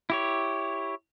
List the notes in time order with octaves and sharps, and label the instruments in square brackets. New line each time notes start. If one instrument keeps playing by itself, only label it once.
[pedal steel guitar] E4 G4 C#5